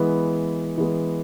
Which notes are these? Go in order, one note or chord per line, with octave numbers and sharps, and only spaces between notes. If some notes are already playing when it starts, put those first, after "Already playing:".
Already playing: E3 G#3 B3
E3 G#3 B3